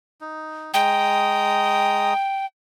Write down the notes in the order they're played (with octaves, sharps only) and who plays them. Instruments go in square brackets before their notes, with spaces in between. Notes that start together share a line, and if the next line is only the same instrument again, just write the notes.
[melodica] D#4
[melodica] G#3 A#5 D#6 [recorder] G5